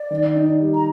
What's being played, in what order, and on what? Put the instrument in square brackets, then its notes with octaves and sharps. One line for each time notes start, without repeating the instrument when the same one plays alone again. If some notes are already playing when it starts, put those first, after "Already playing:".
Already playing: [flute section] D5
[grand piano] D#3
D#4
G3
[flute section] A#5